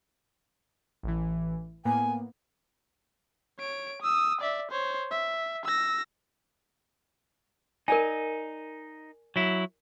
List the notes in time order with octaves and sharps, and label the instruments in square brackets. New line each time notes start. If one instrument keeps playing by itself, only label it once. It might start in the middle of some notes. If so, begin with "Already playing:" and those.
[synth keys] A1 E3
[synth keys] A2 A#3 B3 [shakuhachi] G#5
[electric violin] C#5 D7
D#6 E6
D5 E5
C5 C#5
E5
E6 A#6
[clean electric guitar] D#4 [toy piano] A#4 D5 G#5
[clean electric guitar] F#3 E4